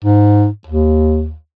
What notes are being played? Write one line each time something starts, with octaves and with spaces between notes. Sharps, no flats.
G#2
D#2